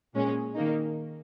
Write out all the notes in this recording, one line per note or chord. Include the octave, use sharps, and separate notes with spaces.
A#2 G#3 C#4
D#3 A#3 D#4